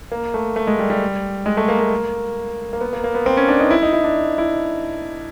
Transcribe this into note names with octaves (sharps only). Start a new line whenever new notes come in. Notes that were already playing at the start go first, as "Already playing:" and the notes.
A#3
A3
A3
G#3
G3
G3
G#3
A3
A#3
A#3
A#3
B3
A#3
A#3
B3
C4
C#4
D4
D#4
E4
D#4
E4
D4
E4